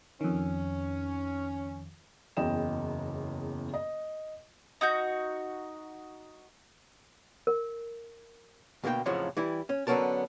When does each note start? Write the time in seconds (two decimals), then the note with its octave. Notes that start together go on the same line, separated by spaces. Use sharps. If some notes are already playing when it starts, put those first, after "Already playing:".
0.21 F2 D#3 C#4
2.37 F#1 E2 C#3 D#5 G5 E7
3.74 D#5
4.81 D#4 F#4 G6
7.47 A#4
8.84 D2 B2 A#3 F#4 G5
9.06 F2 A2 C#3 F3 F#3
9.37 E3 G3 E4
9.69 C#4
9.87 D3 F#3 B3 C#4 A#4 A5